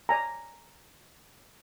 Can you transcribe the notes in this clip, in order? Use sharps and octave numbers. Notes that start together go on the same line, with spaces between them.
D5 G#5 A#5